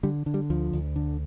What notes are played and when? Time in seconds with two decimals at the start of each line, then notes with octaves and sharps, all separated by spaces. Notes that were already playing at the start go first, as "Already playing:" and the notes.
0.03 D3 G3
0.26 D3
0.34 G3
0.50 D2 F3
0.73 D2
0.96 D3